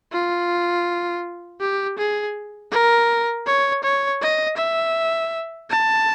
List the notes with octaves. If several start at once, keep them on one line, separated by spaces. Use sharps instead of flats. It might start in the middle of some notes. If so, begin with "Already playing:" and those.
F4
G4
G#4
A#4
C#5
C#5
D#5
E5
A5